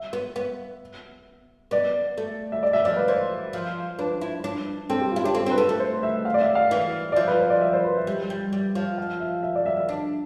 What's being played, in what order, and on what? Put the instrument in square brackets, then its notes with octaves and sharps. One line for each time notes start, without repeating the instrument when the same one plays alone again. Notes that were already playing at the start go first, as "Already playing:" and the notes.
Already playing: [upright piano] E5
[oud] B3
B3
[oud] B3 [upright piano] D5
[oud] A3
[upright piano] E5
D5
E5
[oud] F3 [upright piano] D5
[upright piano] B4
[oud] E3 [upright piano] C5
[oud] F3
[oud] D4 [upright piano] B4
[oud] E4
D4
[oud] C4 [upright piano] A4
[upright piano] G4
[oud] E4 [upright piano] F4
[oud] D4 [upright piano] G4
[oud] C4 [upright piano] A4
[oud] C4
[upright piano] B4
[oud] B3 [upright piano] A4
[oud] A3
[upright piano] C5
E5
F5
D5
E5
F5
[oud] E3
[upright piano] D5
[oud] F3 [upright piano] E5
[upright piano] B4
C5
D5
E5
C5
B4
E5
[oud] G3 [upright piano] E5
[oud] G3
G3
F3
[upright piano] F5
E5
E5
D5
E5
E5
[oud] D4